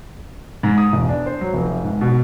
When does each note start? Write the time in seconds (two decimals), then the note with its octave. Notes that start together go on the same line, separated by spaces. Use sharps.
0.63 G#2
0.78 D#6
0.93 E1
1.09 D4
1.26 C5
1.41 F#3
1.54 F1
1.84 G#2
2.01 B2